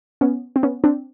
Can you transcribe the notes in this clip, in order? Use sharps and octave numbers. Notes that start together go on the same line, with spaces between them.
B3 C#4
C4
B3 C#4
C4 D4